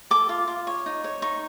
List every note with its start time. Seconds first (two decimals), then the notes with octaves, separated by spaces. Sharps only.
0.11 A4 D6
0.29 F4
0.48 F4
0.67 C#5
0.86 D#4
1.04 C#5
1.22 D#4 C#6